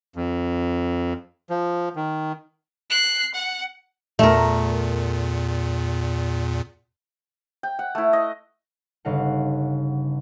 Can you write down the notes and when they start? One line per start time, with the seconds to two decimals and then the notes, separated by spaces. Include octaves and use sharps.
0.16 F2
1.50 F3
1.96 D#3
2.90 F#6 C7
3.34 F#5
4.19 E2 A#2 A3 A#4
7.63 G5
7.79 F#5
7.95 A3 E4
8.13 D#5
9.05 G1 C#3 D#4 F5 F#5